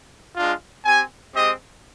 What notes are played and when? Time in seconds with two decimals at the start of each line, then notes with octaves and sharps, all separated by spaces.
0.35 G#3 D4 F4
0.84 C4 G4 G#5
1.34 G#3 C4 G4 D#5